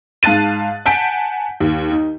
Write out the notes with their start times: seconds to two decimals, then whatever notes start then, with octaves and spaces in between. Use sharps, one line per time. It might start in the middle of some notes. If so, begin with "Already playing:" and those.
0.23 G#2 F5 A5 F#6 A6 D#7
0.86 F#5 G#5 A5 G6 B6 D7
1.61 D#2
1.91 D#4